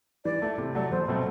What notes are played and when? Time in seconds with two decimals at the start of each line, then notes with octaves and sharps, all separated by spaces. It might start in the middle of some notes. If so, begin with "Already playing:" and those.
0.25 E3 D5
0.42 A3 E4
0.58 C3
0.75 F#3 A3 D5
0.90 E2 C5
1.08 B2 F#3 A3 C4